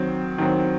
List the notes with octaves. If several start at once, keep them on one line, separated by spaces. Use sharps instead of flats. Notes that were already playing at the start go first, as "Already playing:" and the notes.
Already playing: D#3 F#3 C4
D#3 F#3 C4